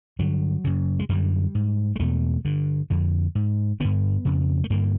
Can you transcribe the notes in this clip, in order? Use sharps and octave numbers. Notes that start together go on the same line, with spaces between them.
G2 D3 F#3
F#2 C#3
G#3
F#2 D3 G3
G#2
G#3
E2 B2 A3
G2 D3
F2 D3
G#2
G2 D3 B3
F2 C#3
A3
G2 D3 A#3